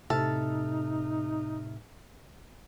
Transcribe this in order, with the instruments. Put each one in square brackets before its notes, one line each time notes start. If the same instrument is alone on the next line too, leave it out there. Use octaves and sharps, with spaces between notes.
[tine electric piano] A2 E5 F6 [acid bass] C3 [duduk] D#4 [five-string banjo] A4